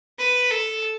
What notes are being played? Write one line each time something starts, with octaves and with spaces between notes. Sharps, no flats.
B4
A4